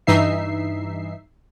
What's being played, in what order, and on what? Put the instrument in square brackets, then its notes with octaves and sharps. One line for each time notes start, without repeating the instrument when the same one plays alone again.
[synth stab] G2 E3 D#4 E5 C7